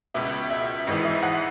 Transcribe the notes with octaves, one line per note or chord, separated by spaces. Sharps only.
C#2 B2 E5
E5
G#1 G#2 E3 D#5
E5
F#5